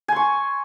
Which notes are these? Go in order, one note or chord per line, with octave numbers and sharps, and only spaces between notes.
G#5 C6 C#6